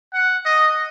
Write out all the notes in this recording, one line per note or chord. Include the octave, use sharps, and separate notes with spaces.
F#5
D#5